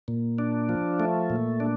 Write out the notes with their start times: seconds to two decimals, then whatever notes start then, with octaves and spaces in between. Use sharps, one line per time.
0.08 A#2
0.38 D4
0.69 F3
1.00 A3
1.30 A#2
1.60 D4